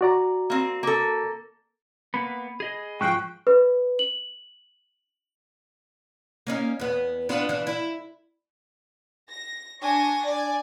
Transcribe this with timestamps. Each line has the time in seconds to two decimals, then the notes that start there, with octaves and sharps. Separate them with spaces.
0.01 F#4 D5 A#5
0.50 A#3 C4
0.83 A#3 A4
2.14 A#3 B3 B5
2.60 G#4 D#5
3.01 G#2 F3 G5 C#6 F#6
3.47 B4
3.99 F#7
6.47 A#3 C#4 D#4
6.79 E2 B3
7.29 B3 D4 F4
7.49 E3 D4
7.67 E4
9.30 A#6
9.81 D4 G#5 C#6 A#6
10.26 D5 G#5